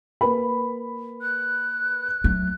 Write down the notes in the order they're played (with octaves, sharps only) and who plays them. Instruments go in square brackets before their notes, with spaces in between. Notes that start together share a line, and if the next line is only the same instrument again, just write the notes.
[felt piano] A#3 B4 B5
[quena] F#6
[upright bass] F#3 A3